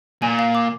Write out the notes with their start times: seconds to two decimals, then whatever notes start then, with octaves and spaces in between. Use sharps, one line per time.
0.22 A#2 G#5
0.39 F5
0.55 D6